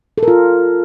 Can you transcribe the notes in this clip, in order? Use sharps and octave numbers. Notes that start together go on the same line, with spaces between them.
A4
A#4
F4